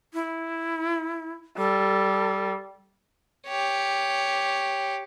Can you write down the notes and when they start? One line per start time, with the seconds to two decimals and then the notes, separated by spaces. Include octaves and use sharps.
0.14 E4
1.58 G3 A4
3.47 G4 C#5